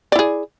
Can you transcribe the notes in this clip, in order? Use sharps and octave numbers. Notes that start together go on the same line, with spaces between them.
E4 G#4 D5